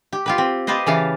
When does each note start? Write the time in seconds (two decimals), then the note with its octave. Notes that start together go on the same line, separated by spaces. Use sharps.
0.13 G4
0.26 F4 G4 B4
0.38 C4
0.67 F4 G4 B4 C5 D#5
0.86 C#3 E3 F5 A5